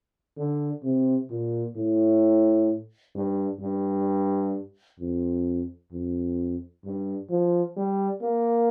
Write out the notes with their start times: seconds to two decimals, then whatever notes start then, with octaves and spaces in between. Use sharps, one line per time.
0.38 D3
0.83 C3
1.30 A#2
1.76 A2
3.15 G2
3.61 G2
4.99 F2
5.92 F2
6.85 G2
7.30 F3
7.77 G3
8.22 A#3